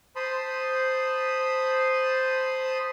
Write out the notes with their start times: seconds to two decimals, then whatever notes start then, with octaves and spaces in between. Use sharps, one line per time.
0.16 C5 A5 B5 C6 D#6